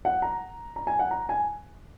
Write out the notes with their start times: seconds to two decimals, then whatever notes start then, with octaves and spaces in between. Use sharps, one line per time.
0.05 F#5
0.22 A#5
0.76 A#5
0.87 G#5
0.99 F#5
1.11 A#5
1.29 G#5